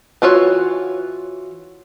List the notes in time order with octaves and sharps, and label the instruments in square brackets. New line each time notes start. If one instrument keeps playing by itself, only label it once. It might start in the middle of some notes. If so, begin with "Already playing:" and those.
[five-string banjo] E3 F4 F#4 C#5